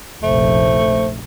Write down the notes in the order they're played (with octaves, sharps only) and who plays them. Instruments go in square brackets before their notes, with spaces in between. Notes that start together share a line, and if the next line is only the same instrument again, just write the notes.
[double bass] F1 A#1 [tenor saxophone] A3 [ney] C5